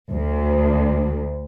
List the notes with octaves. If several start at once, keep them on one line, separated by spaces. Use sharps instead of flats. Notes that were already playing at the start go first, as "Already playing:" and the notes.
D2